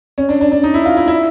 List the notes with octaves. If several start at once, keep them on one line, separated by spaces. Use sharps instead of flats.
C#4
D4
D4
D4
D#4
E4
F4
E4
E4